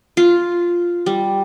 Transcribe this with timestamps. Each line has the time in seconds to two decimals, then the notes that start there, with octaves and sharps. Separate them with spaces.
0.17 F4
1.06 G3